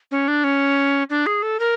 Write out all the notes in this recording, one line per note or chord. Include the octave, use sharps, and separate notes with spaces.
C#4
D4
C#4
D4
G#4
A4
A#4